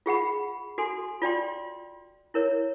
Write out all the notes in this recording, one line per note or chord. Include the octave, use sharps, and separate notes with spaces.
F4 G#4 F#5 B5
F#4 A4 G#5 C6
F4 D5 G5 C6
E4 A#4 C#5